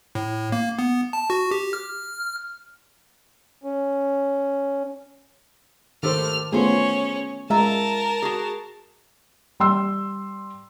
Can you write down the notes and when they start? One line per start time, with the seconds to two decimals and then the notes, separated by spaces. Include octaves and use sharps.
0.15 A2
0.52 A#3
0.79 B3
1.13 A5
1.30 F#4
1.51 G4
1.73 F6
3.64 C#4
6.03 D#3 A3 G4 A4 C5 F6
6.52 A3 B3 C#4 F4 G#4 C5 C#5
7.50 G#3 F4 A#4 E5 A5 A#5
8.22 F#4 G#4
9.60 G3 C6 E6